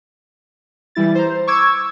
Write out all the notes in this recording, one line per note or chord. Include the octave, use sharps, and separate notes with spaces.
E3 G3 E4 A6
C5 A#5
C#6 D6 E6 G#6